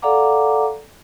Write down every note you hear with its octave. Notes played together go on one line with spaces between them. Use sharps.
A4 D5 F5 F#5 A#5 D6